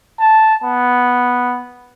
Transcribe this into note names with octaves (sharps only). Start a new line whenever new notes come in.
A5
B3